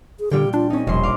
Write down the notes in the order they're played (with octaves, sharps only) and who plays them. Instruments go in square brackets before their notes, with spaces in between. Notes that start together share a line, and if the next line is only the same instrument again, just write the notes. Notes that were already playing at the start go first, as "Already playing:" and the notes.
[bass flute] G#4
[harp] A#2 G3 G5 [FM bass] D3 [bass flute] G4
[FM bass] D4 [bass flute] F4
[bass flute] C4 [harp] C#4 D#4
[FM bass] E1 [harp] A#1 C6 [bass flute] G3
[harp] F5 D6